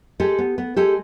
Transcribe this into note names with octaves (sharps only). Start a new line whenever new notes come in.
G#3 G4 A4
B3
B3
G#3 G4 A4